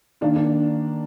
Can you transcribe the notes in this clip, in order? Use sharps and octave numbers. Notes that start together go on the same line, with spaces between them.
D#3 A#3 D4
D4